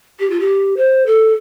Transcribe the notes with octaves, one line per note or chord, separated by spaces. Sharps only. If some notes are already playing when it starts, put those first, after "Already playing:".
G4
F4
G4
C5
A4